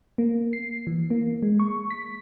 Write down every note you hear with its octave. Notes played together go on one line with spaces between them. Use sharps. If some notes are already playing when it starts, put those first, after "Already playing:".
A#3
C7
E3
A#3
G#3
C#6
B6